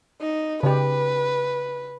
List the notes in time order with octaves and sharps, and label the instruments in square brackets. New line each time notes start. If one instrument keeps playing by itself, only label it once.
[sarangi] D#4
[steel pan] C#3 G4 [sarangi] B4